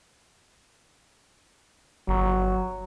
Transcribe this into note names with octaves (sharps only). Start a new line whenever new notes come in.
G1 F#3